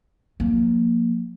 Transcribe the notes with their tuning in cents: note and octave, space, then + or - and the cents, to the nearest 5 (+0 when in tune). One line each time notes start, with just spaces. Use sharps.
F3 +45 A#3 +0